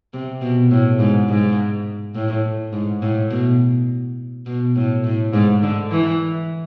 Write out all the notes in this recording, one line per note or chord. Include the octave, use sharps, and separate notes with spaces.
C3
B2
A2
G#2
G#2
A2
G#2
A2
B2
B2
A2
A2
G#2
D3
E3